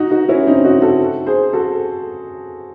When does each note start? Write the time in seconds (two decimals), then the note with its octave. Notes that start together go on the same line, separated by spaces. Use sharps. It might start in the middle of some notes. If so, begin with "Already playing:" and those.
Already playing: D#4 F#4
0.11 D#4 F#4
0.29 C#4 E4
0.47 C4 D#4
0.64 D#4 F#4
0.82 F#4 A4
1.27 G#4 C5
1.53 F#4 A4